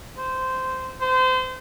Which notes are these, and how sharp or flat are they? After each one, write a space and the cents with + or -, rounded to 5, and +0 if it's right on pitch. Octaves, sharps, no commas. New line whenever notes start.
C5 -15
C5 -30